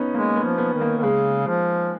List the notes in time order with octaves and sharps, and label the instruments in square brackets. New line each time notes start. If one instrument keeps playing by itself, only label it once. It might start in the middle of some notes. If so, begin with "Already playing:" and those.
Already playing: [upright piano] B3 C#4 D#4
[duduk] G#3 [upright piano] A#3
[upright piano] B3
[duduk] F3
[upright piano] B3
[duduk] D#3
[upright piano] A#3
[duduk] D#3
[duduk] C#3 [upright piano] G#3
[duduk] F3